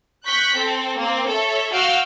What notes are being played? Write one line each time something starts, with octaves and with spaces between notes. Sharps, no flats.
C#6 F#6 G6 B6
C4 A4
A#3 C4
A4 C#5 E5
F#4 F5 E6 F6 G6 D7